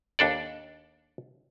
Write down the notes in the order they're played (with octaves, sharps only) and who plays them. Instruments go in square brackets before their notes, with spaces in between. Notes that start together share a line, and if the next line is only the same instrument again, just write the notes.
[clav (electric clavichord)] D#2 D4 A4 D5